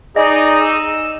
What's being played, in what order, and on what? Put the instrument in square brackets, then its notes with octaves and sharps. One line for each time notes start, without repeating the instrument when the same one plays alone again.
[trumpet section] D#4 [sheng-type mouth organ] G#4 D5 [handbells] D#5
[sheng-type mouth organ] E6